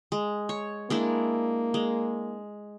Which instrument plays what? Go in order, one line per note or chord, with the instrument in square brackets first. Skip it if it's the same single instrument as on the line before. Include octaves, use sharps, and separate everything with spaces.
[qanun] G#3
C#5
[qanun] G#3 D4 E4 [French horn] A#3
[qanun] G#3